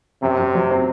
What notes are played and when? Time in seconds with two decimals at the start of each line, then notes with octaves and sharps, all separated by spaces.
0.22 F#2 C3
0.38 F#2
0.55 F#3
0.71 C4